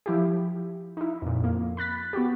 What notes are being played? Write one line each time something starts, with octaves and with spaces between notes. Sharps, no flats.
F3 E4 G4
D#4 E4
F2 A#2
F2 A#3
B5 F#6 A6 B6
B3 F#4 G4